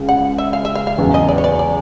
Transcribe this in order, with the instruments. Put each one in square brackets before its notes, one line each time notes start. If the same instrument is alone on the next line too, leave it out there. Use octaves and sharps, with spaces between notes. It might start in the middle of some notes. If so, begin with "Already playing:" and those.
Already playing: [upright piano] C#2 C#3
[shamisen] F#5
E5
F5
E5
F5
F5
[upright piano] E2 C#3 F#3
[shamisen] D#5
D5
C#5
D5
D5